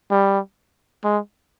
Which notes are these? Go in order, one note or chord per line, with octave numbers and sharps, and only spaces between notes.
G3
G#3